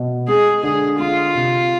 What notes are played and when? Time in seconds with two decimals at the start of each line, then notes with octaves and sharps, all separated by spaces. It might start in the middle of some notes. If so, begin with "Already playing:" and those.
Already playing: B2
0.28 G#3 G#4
0.63 D3 G#4
0.99 G#3 F4
1.35 C3